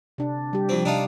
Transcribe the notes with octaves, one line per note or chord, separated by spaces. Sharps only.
C3 D4
G3 G4
F2 C4
C3 D4 D#4 F4